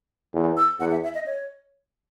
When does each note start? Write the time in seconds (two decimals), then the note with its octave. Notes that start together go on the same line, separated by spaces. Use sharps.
0.34 E2
0.57 E6
0.80 E2 F#5
0.91 E5
1.04 E5
1.14 D#5
1.26 C#5